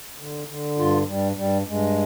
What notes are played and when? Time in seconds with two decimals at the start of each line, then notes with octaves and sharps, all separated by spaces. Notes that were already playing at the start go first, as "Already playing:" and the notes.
0.18 D3
0.47 D3
0.78 G2 F4
1.07 G2 G3
1.36 G2 G3
1.67 G2 G#3